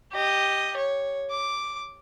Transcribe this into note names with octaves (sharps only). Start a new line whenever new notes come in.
G4 D#5
C#5
D6